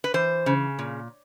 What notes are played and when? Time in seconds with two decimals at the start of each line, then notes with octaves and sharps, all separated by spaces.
0.04 B4
0.14 E3 C5
0.46 C#3
0.79 A#2